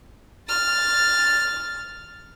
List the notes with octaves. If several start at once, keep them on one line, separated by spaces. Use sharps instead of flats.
F6 A6